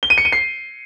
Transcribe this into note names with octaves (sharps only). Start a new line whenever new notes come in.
G7
D#7
C#7
D#7
C7